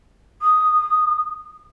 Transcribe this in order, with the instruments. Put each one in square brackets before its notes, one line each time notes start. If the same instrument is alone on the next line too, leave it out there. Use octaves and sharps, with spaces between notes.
[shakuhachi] D#6